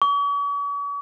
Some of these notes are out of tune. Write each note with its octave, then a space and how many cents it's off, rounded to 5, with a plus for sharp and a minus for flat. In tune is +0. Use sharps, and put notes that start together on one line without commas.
C#6 +45